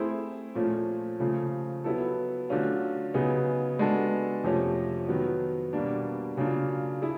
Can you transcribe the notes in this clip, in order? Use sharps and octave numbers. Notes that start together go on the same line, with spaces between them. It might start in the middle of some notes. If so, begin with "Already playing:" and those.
Already playing: A3 C4 E4 G#4 C5
A#2 F3 A3 C#4
C#3 F3 A3
F#3 B3 E4 A4
D3 F#3 A3 C#4 F4
C#3 F#3 B3 D#4 G#4
G#3 B3 D4 F#4 A4
F2 C3 F3 A3 C#4
D#3 F#3 B3
B2 G3 A#3 D4
C#3 F#3 A#3 D4 F4
E4 G#4